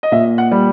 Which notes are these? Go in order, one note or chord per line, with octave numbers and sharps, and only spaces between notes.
D#5
A#2 E5
F#5
G3